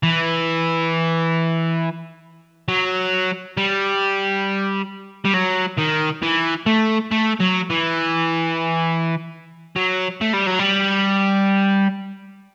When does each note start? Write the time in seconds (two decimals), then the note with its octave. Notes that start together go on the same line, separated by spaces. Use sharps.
0.03 E3
2.68 F#3
3.57 G3
5.25 G3
5.34 F#3
5.78 D#3
6.23 E3
6.66 A3
7.11 A3
7.40 F#3
7.70 E3
9.76 F#3
10.21 A3
10.33 G3
10.46 F#3
10.59 G3